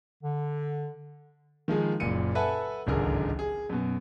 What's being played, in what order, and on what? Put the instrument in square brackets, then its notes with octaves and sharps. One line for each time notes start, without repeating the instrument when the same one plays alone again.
[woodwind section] D3
[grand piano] D#3 F3 G#3 G#4
F#1 F#2 A#2 C#7 D#7
A4 B4 E5 F#5 G#5 A5
D1 G#1 C#2 D3 G#4 A#4
G#4
F#2 B2